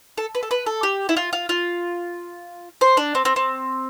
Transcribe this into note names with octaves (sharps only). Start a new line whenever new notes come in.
A4
B4
A4
B4
A4
G4
E4
F4
F4
F4
C5
D4
C4
C4
C4